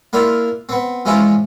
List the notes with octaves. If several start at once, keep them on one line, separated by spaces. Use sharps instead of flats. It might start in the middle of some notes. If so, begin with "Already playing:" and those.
A#3 D4 E4 F4
B3 C4
E3 F3 G#3 C#4 E4 F4